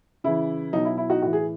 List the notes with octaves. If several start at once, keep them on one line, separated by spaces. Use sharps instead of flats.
C#3 E3 E4
B2 F#3 D#4
E4
E4
D#4 F#4
A2 E3 F#4
G#4